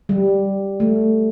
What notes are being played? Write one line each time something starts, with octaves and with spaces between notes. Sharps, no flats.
G3
A3